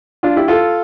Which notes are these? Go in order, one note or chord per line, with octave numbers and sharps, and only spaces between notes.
D4 F4
E4 G4
F4 A4